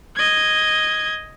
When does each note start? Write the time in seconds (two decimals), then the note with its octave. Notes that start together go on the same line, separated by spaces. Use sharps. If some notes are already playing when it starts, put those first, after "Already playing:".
0.16 D#5 G#6